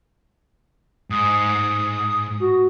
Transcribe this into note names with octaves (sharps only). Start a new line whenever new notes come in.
G#2 D#6
F#4